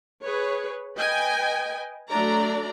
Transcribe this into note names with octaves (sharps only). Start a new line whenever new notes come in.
G#4 B4 C#5
B4 D#5 G5 G#5
F#3 A3 D4 D5 A#5